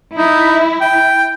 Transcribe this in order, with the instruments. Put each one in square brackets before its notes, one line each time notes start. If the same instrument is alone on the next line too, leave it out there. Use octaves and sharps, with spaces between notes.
[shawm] D#4 [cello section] E4
[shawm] G5